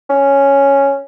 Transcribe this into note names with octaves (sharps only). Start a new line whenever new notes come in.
C#4